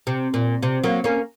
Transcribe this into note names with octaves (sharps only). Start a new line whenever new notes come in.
C3
A#2
C3
F#3 A#3
A#3 C#4